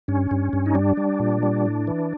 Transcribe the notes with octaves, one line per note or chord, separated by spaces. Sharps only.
G2 C#4
G2
G2
D#4
G3 D4
G3
A#2
G3
A2
E3